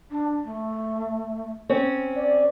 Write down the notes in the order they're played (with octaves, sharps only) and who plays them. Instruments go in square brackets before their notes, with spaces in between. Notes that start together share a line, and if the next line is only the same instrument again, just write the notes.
[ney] D4
A3
[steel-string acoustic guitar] C4 C#4
[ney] D5